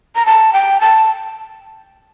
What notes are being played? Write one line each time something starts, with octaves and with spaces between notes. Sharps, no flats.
A#5
A5
G5
A5